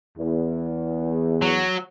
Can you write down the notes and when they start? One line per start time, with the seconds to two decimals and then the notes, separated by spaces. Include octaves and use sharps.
0.17 E2
1.42 F#3